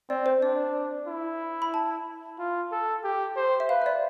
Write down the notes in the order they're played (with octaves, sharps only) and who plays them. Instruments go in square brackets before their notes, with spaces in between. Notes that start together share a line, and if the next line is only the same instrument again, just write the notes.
[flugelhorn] C4 [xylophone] D5
[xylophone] C5
[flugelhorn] D4 [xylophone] D5
[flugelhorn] E4
[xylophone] B5
A5
[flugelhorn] F4
A4
G4
C5
[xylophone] E5
[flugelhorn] B4 [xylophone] F5
[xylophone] E5
D5